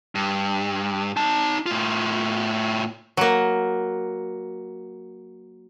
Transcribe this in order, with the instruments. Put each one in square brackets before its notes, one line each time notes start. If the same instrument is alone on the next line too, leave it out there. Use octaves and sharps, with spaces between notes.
[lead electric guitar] G2
D#4 A5
A2 F4
[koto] F#3 A#3